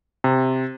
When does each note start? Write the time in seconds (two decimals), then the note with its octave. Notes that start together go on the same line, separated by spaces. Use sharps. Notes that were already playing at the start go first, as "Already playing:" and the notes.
0.24 C3